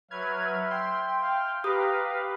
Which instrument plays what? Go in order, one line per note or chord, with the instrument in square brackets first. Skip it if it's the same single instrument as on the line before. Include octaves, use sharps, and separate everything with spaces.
[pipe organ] F#3 B4 F6 [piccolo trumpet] E5 [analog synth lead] G#6
[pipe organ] G5 [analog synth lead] C6
[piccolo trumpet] F5
[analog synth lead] G4 [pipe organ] B4 F5 [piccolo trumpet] A#5 [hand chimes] D#6